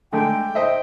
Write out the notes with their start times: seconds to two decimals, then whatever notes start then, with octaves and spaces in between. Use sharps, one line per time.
0.13 D3 G#3 A3 G5
0.55 C5 D#5 E5